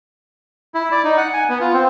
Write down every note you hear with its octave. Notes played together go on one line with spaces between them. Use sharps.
E4
D5
D#4
F#5
G#5
B3
F4
C4